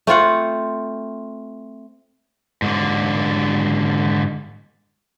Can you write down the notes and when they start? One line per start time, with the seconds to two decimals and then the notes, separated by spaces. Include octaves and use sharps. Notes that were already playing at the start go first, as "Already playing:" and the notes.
0.07 A3 C4 F4 F#5
2.62 G#2 D3